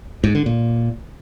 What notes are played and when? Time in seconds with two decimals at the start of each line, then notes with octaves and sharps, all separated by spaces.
0.24 G#2
0.35 D3
0.46 A#2